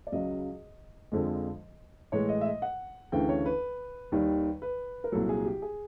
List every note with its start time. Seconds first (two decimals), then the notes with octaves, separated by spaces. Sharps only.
0.07 D5
0.12 C#2 C#3 F#3 D#5
1.12 F2 D3 F3 G#3
2.12 A2 E3 G#3 C#5
2.29 D#5
2.41 E5
2.46 D#5
2.62 F#5
3.12 D2 C#3 E3 G5
3.29 C#5
3.46 B4
4.12 D#2 D#3 G3
4.62 B4
5.04 A#4
5.12 C2 A#2 F#3 A4
5.29 G#4
5.45 G4
5.62 G#4